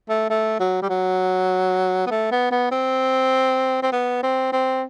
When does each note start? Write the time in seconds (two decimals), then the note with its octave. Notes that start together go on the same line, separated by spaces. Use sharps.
0.09 A3
0.29 A3
0.59 F#3
0.82 G3
0.89 F#3
2.07 B3
2.11 A3
2.31 B3
2.51 B3
2.71 C4
3.82 C4
3.92 B3
4.23 C4
4.52 C4